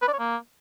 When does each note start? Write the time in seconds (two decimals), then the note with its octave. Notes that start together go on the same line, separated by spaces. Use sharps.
0.02 B4
0.08 D5
0.13 C#5
0.19 A#3